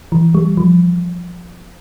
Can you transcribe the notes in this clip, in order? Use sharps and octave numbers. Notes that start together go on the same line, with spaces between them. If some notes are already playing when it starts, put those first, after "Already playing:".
E3
G3
F3